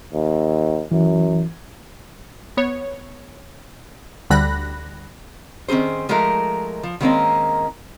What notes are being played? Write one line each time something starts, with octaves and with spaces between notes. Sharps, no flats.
D#2
F#2 E3
B3 C#5
D2 D3 G3 B5 F#6 A#6
D#3 C4 C#4 G#4 C5
F3 G#3 A3 D#4 A#4
F3
D#3 G#3 A#3 C4 C#4 D#4